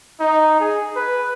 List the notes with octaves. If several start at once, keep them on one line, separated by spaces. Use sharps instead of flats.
D#4
G#4
B4